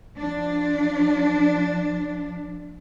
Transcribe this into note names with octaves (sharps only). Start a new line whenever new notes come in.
F3 D4